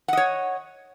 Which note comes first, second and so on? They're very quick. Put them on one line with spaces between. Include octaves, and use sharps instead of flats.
F#5 D#5 C#5